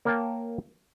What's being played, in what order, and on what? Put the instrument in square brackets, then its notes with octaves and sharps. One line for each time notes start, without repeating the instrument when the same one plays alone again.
[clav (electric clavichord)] A#3 A#4 C#5 F5 G5 A5